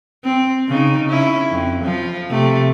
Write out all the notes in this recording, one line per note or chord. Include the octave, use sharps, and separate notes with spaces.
C4
C#3 D#4
C#4 E4
F2
F3
C3 A3